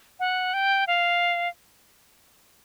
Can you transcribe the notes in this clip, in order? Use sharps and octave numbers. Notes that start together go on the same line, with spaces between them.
F#5
G5
F5